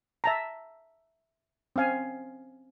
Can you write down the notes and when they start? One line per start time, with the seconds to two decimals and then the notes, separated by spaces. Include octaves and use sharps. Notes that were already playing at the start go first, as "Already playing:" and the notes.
0.24 E5 A5 A#5
1.76 C4 C#4 F5 G#5